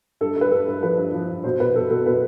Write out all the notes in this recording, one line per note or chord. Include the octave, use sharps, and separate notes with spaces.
G2 A4
G2
B4
G2 A4
G2
F3 B4
G2
F3
G2
B2 C5
B2 B4
B2 A4
B2 A4
B2 B4